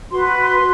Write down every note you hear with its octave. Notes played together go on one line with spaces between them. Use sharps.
F#4 B4 C6
B5
C6
F#4 B4